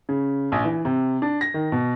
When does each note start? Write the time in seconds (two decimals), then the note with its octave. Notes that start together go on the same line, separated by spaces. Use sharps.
0.09 C#3
0.52 A#1
0.65 E3
0.85 C3
1.22 D4
1.41 A#6
1.54 D#3
1.72 B2